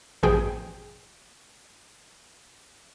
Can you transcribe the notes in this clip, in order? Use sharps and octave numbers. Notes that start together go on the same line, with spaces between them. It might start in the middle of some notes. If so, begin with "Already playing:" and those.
A1 G2 B2 F3 G#4 G5